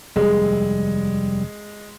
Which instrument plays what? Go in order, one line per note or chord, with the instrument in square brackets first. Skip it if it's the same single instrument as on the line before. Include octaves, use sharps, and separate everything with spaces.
[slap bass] F1 D#2 [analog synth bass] G3 [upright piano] G#3